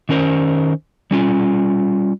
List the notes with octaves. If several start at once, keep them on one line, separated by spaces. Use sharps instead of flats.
D#3 C#4 A#4 C5
G3 C#4 F4